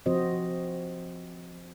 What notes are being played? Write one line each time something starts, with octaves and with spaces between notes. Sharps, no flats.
F3 C4 F#4 C5 D#5